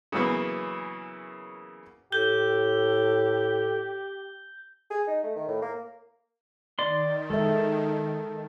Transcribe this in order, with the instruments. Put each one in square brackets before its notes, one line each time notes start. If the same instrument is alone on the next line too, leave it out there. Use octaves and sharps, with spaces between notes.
[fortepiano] C#3 E3 F#3 A#3 B3
[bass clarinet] A2 [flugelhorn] G4 [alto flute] A4 [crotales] G6 G7
[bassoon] G#4
D#4
A3
D#3
A2
A#3
[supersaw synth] D#3 [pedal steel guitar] D5 C6
[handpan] G#3 E5 [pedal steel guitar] A4